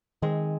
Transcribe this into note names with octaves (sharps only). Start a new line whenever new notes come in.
D#3 G#3 C4